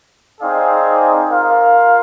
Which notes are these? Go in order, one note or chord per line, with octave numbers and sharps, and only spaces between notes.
C4 D#4 G#4 D5 F5
F4 A#4 F5